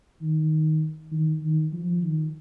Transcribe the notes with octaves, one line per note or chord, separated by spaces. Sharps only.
D#3
D#3
D#3
F3
D#3